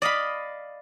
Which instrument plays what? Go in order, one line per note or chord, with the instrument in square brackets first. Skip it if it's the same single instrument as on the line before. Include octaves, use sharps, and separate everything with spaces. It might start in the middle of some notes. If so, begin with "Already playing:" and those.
[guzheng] D5 D#5 F5 B5